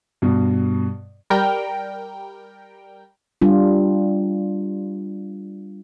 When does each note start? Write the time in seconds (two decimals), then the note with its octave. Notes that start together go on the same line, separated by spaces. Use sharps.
0.22 G2 B2
1.30 G3 A#4 G5
3.42 G3 D4 F4